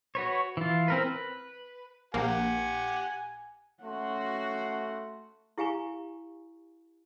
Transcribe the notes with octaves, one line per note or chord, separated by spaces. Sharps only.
F#4 B4 C#5
E3 F4
C4 A#4 B4
B4
A#1 A#3 G4 F#5 G#5
A3 C#4 F#4 F#5 C6
E4 G4 F5 G#5 A#5 C#6